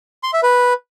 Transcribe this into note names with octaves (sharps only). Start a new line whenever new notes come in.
C6
E5
B4